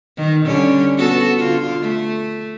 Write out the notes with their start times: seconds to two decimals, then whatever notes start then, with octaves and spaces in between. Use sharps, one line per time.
0.17 D#3
0.46 D3 G3 C#4
0.98 B3 F#4 A4
1.38 D3 F4
1.82 A3